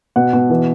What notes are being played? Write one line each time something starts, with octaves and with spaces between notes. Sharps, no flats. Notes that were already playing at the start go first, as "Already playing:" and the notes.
B2 F#5
B2
E3